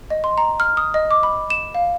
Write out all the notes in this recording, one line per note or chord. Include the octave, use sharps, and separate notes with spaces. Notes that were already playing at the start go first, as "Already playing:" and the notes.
D#5
C6
A#5
F6
D#6
D#5
D6
B5
E7
F5